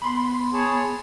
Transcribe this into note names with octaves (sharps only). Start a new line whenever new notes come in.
B3 B5 C6
G#4 C#5 A5